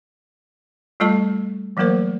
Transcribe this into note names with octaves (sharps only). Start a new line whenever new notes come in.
G3 A3 F4 A4 D#5 A5
E3 F#3 A3 A#3 A#4 C5